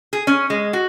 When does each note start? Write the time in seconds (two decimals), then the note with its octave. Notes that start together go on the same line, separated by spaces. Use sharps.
0.13 G#4
0.27 C#4
0.50 G#3
0.73 F#4